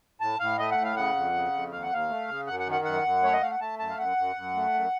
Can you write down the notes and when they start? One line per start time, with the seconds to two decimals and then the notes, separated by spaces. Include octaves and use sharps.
0.21 A2 A5
0.40 A2 F5
0.58 A3 D#5
0.71 F#5
0.78 A2
0.84 F5
0.96 C#3 F#5
1.15 F2
1.34 C#3
1.52 F2
1.71 D#2 F5
1.83 F#5
1.90 D#2 F5
2.09 A3
2.28 C#3
2.47 F#2 F#5
2.60 F#5
2.66 D#3
2.72 F#5
2.85 F#2 F#5
3.04 F#2
3.22 A3 C#5
3.33 D#5
3.41 A3 F5
3.51 F#5
3.60 A3 A5
3.79 F#2 A5
3.90 F5
3.98 F#2 F#5
4.17 F#2
4.36 F#2
4.55 A3
4.74 F#2